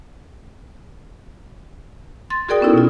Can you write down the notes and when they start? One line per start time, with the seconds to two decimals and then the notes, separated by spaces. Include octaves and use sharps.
2.30 C6 A6
2.49 F#4 G#4 A#4 D5 G5 D#6
2.61 B3 C#4 D#4 E4 A4
2.73 B2 F4